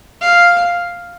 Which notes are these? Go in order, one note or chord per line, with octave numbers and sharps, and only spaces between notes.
F5